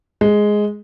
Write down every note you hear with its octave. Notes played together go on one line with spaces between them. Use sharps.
G#3